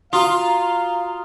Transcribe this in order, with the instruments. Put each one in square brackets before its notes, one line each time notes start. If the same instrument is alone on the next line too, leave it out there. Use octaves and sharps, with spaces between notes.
[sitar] F4 [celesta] F#4 D#6 [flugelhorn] F5 [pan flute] A#5